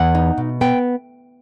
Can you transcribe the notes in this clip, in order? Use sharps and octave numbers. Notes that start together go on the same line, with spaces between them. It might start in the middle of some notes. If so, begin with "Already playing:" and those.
Already playing: E2 F#5
D#4
B2
B3 G5